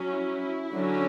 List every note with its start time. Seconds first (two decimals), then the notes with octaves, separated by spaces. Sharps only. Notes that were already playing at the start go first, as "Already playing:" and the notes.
Already playing: F#3 C#4
0.10 E4
0.73 D3 F#3 C#4